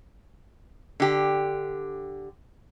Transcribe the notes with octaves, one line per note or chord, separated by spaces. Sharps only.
D3 G4